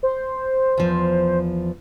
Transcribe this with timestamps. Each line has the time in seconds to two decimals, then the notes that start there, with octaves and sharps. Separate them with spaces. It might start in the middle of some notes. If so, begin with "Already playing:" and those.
0.03 C5
0.78 E2 F3